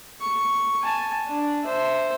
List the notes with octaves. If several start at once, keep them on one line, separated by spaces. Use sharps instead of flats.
C#6
G#5 A5
D4
C5 E5